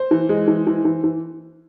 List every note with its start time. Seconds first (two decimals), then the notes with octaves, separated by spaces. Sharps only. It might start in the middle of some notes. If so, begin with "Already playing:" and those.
Already playing: C5
0.11 E3
0.29 G#3
0.48 E3
0.67 E3
0.85 E3
1.04 E3